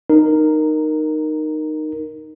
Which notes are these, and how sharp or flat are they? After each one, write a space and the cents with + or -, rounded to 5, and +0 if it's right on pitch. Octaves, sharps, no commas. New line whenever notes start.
D#4 -15 A#4 +0